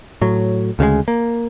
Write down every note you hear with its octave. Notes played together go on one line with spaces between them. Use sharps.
A2 F#3
D2 C#3 E3 G#3
A#3